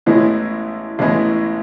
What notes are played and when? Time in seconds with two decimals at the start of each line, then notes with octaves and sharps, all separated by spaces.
0.06 A1 A2 E3 G#3 B3
0.99 A1 A2 E3 G#3 B3